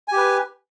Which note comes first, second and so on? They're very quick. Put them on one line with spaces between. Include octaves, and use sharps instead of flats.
G#5 G4 B4